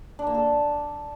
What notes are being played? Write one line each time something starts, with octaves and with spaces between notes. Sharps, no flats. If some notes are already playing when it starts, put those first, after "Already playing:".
D4
A#3
A4